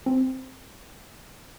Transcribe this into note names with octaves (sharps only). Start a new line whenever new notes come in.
C4